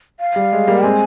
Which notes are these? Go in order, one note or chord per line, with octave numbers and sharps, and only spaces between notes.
F5
G3
G#3
G3 A#3
G#3 C4 G#5